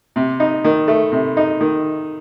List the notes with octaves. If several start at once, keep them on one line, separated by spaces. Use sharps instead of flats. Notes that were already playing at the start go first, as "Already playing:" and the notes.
C3
D#4
D#3
A3
C3
D#4
D#3